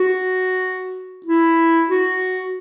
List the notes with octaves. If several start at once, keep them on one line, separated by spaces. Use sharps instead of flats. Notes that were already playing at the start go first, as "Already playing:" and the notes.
Already playing: F#4
E4
F#4